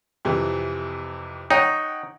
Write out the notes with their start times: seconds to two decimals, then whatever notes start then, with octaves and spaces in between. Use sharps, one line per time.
0.25 F2 C3 E3
1.51 D#4 C#5 F#5 G5